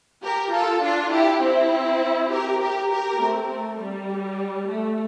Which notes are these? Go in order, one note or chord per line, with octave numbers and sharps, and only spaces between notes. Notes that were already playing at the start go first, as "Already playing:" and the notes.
G4 A#4
F4 A4
D4 F4
E4 G4
C4 E4
G4 A#4
G4 A#4
G4 A#4
A3 C4
A3
G3
A3